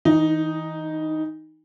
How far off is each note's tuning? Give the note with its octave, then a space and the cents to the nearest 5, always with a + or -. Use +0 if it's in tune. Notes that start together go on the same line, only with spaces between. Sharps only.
E3 -30 D#4 +0